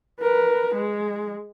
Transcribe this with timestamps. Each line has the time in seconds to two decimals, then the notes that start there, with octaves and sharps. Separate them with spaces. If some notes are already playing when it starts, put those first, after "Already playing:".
0.21 A#4 B4
0.75 G#3